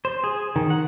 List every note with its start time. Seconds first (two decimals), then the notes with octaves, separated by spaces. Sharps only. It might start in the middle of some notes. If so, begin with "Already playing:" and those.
0.05 C5
0.24 G#4
0.56 D#3
0.70 F#5